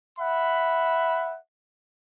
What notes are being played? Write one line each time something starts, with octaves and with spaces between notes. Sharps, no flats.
E5 F#5 B5